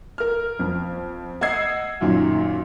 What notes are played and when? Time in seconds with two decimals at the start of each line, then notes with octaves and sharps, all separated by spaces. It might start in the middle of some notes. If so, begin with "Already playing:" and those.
0.18 A#4 F6
0.59 F2
1.41 D#5 F#5 E6 G#6 C7
2.01 F#2 A#2 D#3 F#3